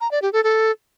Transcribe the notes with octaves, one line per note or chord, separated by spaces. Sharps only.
A#5
D5
G4
A4
A4